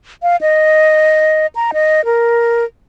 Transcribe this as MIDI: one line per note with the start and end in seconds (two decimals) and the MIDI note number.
0.23 0.36 77
0.41 1.47 75
1.55 1.71 82
1.74 2.05 75
2.05 2.65 70